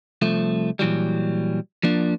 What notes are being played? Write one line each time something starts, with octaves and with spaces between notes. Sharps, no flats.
C2 F3 A3
A#2 E3 F#3 G3
F3 A#3 D4